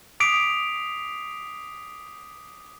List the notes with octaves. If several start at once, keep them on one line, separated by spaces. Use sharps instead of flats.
D6 D#6 B6 C7 D7 F7